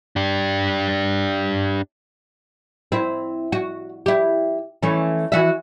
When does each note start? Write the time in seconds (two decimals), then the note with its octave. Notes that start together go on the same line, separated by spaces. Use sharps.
0.16 D4 G4
2.92 C4 E4
3.52 F#4
4.06 E4 G4
4.83 E3 A3 C#4
5.32 E3 F#4 E5